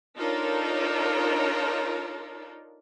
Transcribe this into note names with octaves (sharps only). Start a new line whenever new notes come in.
D4 D#4 F4 A4 A#4 C#5